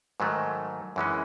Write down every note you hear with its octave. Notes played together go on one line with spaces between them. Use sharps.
G#2 D#3 F#3 A3
F#2 E3 G#3 C#4